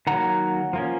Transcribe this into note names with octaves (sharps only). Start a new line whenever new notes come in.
D#3 F#3 A#3 F#5 A#5
F3 A#3 C#4